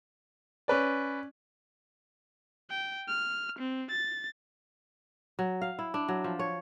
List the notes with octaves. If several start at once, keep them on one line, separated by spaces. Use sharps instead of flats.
C#4 B4 D5
G5
F6
C4
A6
F#3
F5
E4
D4
F#3
F3
C#5